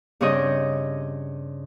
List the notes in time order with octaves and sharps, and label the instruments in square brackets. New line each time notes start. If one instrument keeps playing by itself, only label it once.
[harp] G2 C#3 C4 C#5 D#5 G6